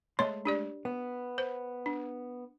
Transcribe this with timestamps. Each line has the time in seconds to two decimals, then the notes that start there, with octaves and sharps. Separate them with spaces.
0.19 G#3 A3 C#5 C6
0.45 D4 G4 D5
0.85 B3
1.38 C5
1.86 D4